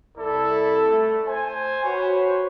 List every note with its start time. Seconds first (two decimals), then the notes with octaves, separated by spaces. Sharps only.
0.17 C2 E4 A4 D5
0.87 A3
1.27 C5 G#5
1.85 F#4 B4 C#5